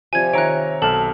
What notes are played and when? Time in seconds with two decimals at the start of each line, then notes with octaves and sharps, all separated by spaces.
0.13 C3 F3 G3 G#5 G#6
0.33 D#3 A#4 C#5 E5 F5 A#5 F#6 D7
0.82 B1 A4 A5 F6